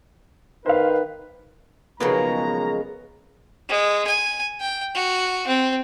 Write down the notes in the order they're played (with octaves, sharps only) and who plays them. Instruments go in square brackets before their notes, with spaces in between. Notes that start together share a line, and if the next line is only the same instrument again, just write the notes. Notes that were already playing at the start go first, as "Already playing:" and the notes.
[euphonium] D#3 [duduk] B4 [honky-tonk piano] C5 F5
[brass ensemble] B1 F3 A#5 [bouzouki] C#3 G#3 A#3 [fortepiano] B3
[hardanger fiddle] G#3
G#5
G5
F#4
C4